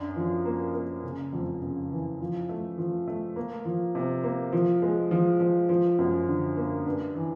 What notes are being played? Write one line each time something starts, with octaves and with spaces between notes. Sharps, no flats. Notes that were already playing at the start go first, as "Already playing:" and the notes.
Already playing: F#2 D4
F3
A#3
A#3
C#3
F2
C#3
E3
F3
A3
F3
A3
A#3
F3
C3
A#3
F3
G#3
F3
F3
F3
F#2
D3
A#3
G2
E3